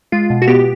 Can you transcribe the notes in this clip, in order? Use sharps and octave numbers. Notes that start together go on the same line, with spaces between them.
G#3 F4
B2
F#4
B3 G4